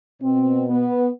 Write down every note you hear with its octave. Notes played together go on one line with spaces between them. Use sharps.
B2 C4
B3